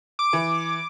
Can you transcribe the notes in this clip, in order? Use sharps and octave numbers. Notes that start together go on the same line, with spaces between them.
D6
E3